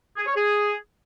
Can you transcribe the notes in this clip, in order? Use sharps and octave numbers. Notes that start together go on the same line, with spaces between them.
G#4
C#5
G#4